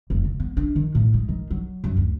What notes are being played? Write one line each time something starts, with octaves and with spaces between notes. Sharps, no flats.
F1
C#2
B3
D4
D#3
A2
G#3
D#3
F#3
F#2
D2